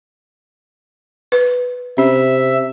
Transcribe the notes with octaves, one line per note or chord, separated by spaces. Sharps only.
B4
C3 C#4 E5